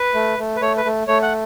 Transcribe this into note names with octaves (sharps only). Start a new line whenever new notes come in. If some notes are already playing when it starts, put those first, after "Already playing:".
Already playing: B4
A3
A3
B4
A3 C#5
B4
A3
A3 C#5
F#5